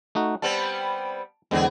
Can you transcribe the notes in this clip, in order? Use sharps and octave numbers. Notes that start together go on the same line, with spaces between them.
A3 D#4 F#4
G3 B3 C4 A5
E2 D3 G#3 B3 C4 G#4